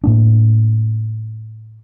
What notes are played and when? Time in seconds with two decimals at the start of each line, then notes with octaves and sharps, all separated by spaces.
0.04 A2 A#3 D4